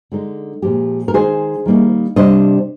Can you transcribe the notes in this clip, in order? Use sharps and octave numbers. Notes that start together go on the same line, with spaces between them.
D3 G#3 D#4
A#2 F3 G#3 G4
A#4
D#3 G#3 D#4 G#4 C5
D#3 G3 A#3 D#4
C3 G3 D4 C5 D#5